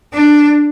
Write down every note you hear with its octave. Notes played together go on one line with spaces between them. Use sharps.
D4